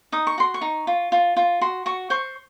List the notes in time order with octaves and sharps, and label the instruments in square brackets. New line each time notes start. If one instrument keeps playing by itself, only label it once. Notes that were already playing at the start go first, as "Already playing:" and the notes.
[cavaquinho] D#4 D#6
C#6
F#4 C6
C#6
D#4
F4
F4
F4
F#4 C6
F#4 C#6
C5 C#6